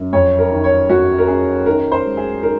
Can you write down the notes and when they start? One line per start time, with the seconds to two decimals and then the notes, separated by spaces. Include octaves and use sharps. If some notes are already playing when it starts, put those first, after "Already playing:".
Already playing: F#2
0.13 F2 C#5
0.39 A#4
0.51 D#3
0.64 C#5
0.89 F2 F#4
1.18 A#4
1.28 C#4 G#4
1.66 D#3 A#4
1.92 C5
2.05 G#3
2.17 G#4
2.43 D#3 A#4